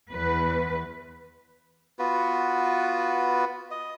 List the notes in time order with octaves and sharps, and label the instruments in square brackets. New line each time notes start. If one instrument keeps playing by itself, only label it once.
[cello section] E2 B4
[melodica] B3 F4 F#4 B4
D#5